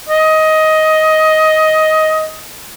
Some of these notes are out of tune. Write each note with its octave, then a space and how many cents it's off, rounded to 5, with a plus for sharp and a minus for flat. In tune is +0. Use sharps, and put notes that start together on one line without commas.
D#5 +15